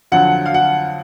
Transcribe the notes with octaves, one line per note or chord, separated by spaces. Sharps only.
F2 D3 F#3 F#5
F5
F#5